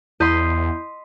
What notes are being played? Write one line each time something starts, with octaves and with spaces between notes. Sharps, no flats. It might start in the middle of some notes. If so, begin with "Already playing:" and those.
E2 E4 D#5 B5 C6 G6